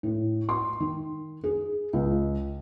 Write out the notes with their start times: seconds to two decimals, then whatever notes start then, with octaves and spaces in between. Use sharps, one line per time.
0.03 A2
0.49 C6
0.80 D#3
1.44 G#4
1.93 C#2